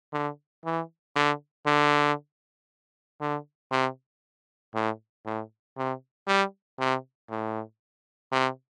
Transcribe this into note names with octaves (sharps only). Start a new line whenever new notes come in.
D3
E3
D3
D3
D3
C3
A2
A2
C3
G3
C3
A2
C3